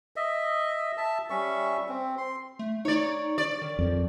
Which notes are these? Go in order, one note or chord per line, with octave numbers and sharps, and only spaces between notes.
D#5 E5
E5 A5
G3 C#4 E5 C#6
C4
C6
A3
D#4 C#5 D5
D5
D#3
F2